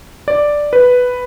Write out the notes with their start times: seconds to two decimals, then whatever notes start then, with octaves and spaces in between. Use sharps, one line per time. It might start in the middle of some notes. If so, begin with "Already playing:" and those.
0.28 D5
0.73 B4